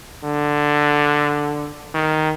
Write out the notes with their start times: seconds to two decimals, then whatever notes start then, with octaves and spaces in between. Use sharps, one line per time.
0.23 D3
1.94 D#3